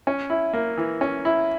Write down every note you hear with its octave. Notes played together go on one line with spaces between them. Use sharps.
C#4
E4
A#3
E3
C#4
E4